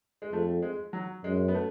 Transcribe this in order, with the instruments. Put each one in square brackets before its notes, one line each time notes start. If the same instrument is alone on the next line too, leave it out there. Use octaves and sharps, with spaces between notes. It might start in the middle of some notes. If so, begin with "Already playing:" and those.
[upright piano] G#3
[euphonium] F2 [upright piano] A3
[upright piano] G#3
F#3
[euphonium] F#2 [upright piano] G#3
[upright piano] B3
A3